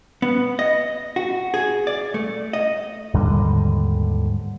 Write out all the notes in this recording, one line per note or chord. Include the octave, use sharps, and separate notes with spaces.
B3
D#5
F#4
G#4
D5
A3
D#5
D#2 G#2 D3 G3